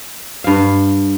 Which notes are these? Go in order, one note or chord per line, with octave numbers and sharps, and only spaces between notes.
G2 F5